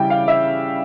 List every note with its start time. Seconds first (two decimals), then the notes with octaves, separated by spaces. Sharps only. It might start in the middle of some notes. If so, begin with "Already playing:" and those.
Already playing: C#3 G3 C#4 E4 G5
0.10 F5
0.28 E5